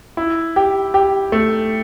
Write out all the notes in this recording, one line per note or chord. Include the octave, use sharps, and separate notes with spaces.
E4
G4
G4
A3